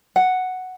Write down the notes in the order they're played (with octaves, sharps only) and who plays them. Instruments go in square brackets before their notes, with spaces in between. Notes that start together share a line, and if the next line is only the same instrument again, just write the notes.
[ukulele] F#5